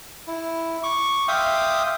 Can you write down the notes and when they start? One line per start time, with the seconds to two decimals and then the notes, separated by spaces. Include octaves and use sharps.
0.27 E4
0.83 C#6 D6
1.28 E5 F5 G5 C6 D6 D#6